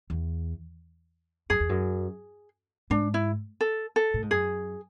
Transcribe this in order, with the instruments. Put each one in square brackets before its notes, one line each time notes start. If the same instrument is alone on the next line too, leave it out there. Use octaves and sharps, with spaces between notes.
[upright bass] E2
[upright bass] F#2 [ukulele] G#4
[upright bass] E2
F#2
[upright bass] G#2 [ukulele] D4
[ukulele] E4
A4
A4
[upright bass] A2
G#2
[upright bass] F#2 [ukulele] G#4